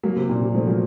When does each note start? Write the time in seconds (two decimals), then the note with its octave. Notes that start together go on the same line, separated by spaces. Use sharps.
0.03 F#3 A#3
0.16 C3
0.29 A#2
0.42 C3
0.54 F3 A3
0.67 F#3 A#3